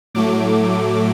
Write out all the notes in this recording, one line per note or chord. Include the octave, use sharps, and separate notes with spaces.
A2 F#3 A3 D6